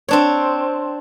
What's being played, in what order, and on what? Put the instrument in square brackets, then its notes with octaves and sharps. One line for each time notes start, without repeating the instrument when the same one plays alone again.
[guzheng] C4 D4 C#5